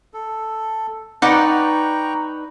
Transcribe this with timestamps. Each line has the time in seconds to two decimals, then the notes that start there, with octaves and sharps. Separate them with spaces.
0.14 A4
1.22 D#4 B4 D5 F#5 G5 A#5 C#6 D6